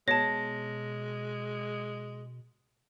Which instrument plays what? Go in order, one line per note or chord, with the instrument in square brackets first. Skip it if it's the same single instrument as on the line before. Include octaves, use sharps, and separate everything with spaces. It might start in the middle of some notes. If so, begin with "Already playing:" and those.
[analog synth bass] B2 [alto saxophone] G#3 [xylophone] C#5 A5 [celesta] A#6